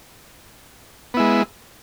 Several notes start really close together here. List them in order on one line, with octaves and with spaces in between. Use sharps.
B3 E4 G#3